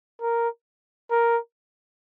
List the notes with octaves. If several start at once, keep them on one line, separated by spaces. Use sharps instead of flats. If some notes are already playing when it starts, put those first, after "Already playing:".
A#4
A#4